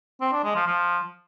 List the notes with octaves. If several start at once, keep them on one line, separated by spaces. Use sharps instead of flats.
C4
D4
G#3
F3
F3